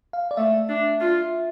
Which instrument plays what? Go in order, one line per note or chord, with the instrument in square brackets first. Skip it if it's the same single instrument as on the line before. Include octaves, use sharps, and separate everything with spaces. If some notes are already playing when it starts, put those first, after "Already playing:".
[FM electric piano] F5
D5
[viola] A3 [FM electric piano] E5
[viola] D4
F4